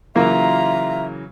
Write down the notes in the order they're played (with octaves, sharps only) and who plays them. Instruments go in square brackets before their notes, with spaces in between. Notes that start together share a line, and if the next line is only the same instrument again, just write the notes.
[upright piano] C#3 E3 F#3 [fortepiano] A#3 [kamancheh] F4 A#5 [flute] E5